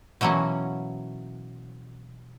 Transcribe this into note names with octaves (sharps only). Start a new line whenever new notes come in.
B2 E3 F#3 A#3 C#4